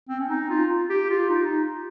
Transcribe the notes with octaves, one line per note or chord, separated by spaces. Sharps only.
C4
C#4
D#4
F4
G4
F4
D#4